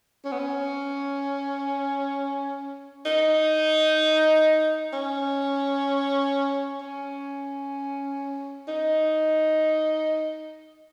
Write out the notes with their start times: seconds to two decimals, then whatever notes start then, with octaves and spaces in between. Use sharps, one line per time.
0.25 C#4
0.32 B3
0.39 C#4
3.06 D#4
4.93 C#4
6.81 C#4
8.68 D#4